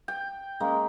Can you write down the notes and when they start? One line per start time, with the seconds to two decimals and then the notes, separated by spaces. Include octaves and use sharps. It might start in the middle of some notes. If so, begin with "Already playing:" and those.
0.08 G5
0.60 G#3 A#3 C#4